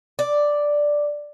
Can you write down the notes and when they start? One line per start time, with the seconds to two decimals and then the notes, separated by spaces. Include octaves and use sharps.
0.19 D5